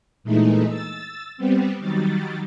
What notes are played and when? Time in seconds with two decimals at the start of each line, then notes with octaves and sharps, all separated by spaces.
0.24 A#2 E3 G#3 A3 D#4
0.67 E6 A6
1.37 G3 B3 C4
1.79 D#3 F#3 G3 A6